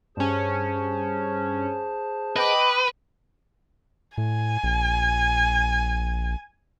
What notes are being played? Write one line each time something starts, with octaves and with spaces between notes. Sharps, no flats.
G2 C#4 G#4 C5 A5
B4 D#5 G5 D6
A2 G#5
A#1